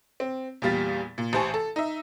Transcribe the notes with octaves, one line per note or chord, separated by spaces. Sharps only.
C4
E2 A#2 G3 F5 A6 B6
A#2
A1 G4 C5 G#5 A5 C#6
A4
D#4 E5